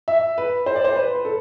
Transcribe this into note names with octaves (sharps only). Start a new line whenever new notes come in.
E5
B4
C5
D5
C5
B4
B4
A4